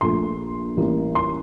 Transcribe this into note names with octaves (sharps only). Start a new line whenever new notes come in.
A#1 A#2 A3 C6
A1 A2 E3 G3 A#3
C6